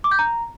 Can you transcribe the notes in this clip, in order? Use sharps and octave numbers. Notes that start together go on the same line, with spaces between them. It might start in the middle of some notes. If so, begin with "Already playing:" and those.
D6
G6
A#5